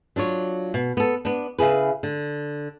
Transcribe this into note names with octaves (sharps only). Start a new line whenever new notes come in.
F#3 D4 F4 C#5
B2
B3 A4
B3 D4
C#3 E4 G#4 B4
D3